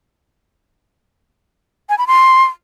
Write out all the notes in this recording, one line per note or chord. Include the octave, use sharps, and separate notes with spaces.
G#5
B5
C6